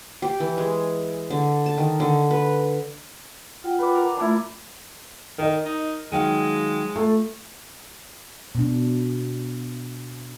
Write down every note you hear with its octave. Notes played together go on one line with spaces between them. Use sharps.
G4
E3
G#3
D3
A5
D#3
D3
B4
F4 F#5 G5
B4 D5
A#4
A3 D4 E4 F4
D#3 A#4 D#5
D#4
D#3 F#3 G#3 F5
A3 F4
B2 D4